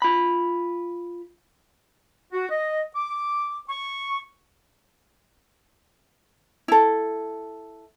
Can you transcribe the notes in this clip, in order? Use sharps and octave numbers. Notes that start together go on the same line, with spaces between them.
F4 B5
F#4
D#5
D6
C#6
E4 A4